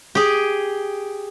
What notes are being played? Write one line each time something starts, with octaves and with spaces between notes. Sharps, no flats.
G4 G#4